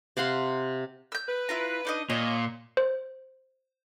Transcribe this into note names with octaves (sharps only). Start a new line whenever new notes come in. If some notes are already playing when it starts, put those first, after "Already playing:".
C3 F5 F#5 C6
E6 G6
B4
E4 F4 A#5
D4 D#4 D#5
A#2 C#5 D#5
C5